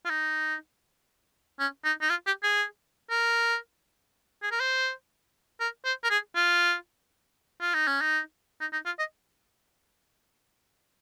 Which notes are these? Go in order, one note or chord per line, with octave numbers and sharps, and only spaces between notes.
F4
D#4
C#4
D#4
D#4
F4
G4
G#4
A#4
G#4
A#4
C5
A#4
C5
A#4
G#4
F4
F4
D#4
C#4
D#4
D#4
D#4
F4
D#5